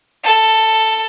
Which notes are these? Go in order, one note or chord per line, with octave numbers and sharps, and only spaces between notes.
A4